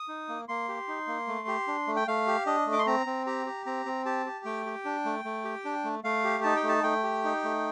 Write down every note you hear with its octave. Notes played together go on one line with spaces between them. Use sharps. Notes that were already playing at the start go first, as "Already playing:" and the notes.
Already playing: D#6
D#4
A#3
A#3 C6
G4
D#4
A#3
A3
G4
D4
A3
G5
A3 F5
G4
D4 D#5
A3
D6
C6
C4 A#5
C4
G4 A#5
G4
C4 A#5
C4
G4 A5
G4
A3 G5
G4
D4
A3
A3
G4
D4
A3
A3 F5
G4
D#4 A5
G5
A3
A5
A3 G5
G4
D#4
A3